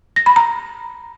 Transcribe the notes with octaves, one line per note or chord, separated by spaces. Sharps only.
A#6
B5
A#5